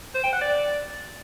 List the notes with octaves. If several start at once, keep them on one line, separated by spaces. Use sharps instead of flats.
C5
G5
F#5
D5